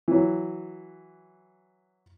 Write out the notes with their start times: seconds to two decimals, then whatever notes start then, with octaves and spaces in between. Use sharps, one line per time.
0.08 E3 F#3